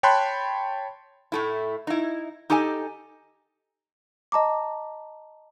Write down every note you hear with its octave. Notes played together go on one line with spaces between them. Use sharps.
C#5 G5 A5 B5 C6 F#6
A2 A3 E4
D#4 E4
D#4 G4 A4 D#5 G#5
D#5 A5 A#5 D6